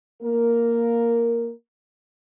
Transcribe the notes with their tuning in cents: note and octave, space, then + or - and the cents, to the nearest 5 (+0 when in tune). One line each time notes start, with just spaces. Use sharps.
A#3 +0 A#4 +0